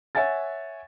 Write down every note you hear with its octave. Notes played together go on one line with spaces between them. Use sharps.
C#5 E5 F#5 G#5 A6